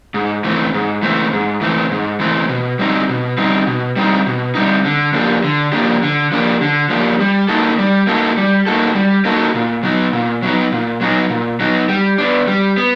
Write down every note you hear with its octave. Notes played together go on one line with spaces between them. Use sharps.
G#2
E3 A3 C4
G#2
E3 A3 C4
G#2
E3 A3 C4
G#2
E3 A3 C4
B2
G3 C4 D#4
B2
G3 C4 D#4
B2
G3 C4 D#4
B2
G3 C4 D#4
D3
F3 A#3 D4 G4
D3
F3 A#3 D4 G4
D3
F3 A#3 D4 G4
D3
F3 A#3 D4 G4
G3
A#3 D#4 F#4 A4
G3
A#3 D#4 F#4 A4
G3
A#3 D#4 F#4 A4
G3
A#3 D#4 F#4 A4
A#2
F#3 B3 D#4
A#2
F#3 B3 D#4
A#2
F#3 B3 D#4
A#2
F#3 B3 D#4
G3
B3 D4
G3
B3